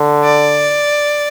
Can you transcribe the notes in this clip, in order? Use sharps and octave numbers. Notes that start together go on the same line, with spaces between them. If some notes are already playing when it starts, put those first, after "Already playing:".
Already playing: D3
D5